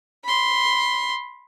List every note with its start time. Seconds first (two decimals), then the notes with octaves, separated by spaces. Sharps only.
0.24 B5 C6